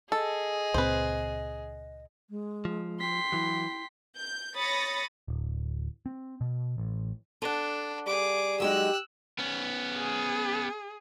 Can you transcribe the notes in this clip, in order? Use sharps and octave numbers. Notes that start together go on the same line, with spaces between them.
G#4 A4 D#5
C#2 A#2 C4 B4 C5
G#3
F3
G5 C6 B6
E3 F#3 E4
G6
C#5 B5 D#6 A6 A#6 C#7
D1
C4
B2
A1
D4 A4 F#5
G3 G#4 D6
F#3 G#3 D#4 G4 E6 F#6
B3 C#4
G#4